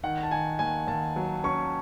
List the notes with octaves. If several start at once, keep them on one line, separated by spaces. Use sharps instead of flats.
D#3 F#5
A5
D#3 G#5
D#2 G#5
D#2 A5
F#3
C#4 C#6